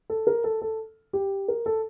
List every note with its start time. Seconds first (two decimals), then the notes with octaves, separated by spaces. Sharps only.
0.10 A4
0.27 A#4
0.44 A4
0.61 A4
1.13 G4
1.48 A#4
1.66 A4